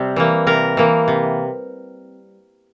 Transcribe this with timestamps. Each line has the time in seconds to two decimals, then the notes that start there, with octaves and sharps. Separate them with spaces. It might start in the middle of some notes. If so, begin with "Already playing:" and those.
Already playing: C3 G3 C4
0.16 E3 A#3
0.47 C3 A#4
0.77 E3 A#3
1.08 C3